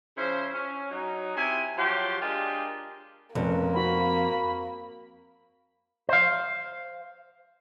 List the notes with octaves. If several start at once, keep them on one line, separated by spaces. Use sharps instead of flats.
C#3 F3 C#4 E4 C5
C#4
F#3 D#4
C3 E4 G#5
F3 F#3 G4 C#5 F#5 C6
G#3 D4 F4 G4 A#4 G5
F1 F2 A#3 C#4
C4 F#4 B5
C5 F5